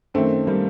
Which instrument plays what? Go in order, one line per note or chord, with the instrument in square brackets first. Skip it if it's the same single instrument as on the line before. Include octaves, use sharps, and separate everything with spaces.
[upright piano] F#2 D#3 A3 C4
G3 A#3